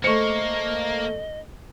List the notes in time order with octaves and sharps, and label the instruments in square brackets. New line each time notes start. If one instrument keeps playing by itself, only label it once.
[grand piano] A3 C#7 [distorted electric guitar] A#3 [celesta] C5 C#6 [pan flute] D#5